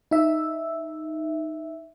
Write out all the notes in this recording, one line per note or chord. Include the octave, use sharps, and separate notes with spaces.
D#4 E5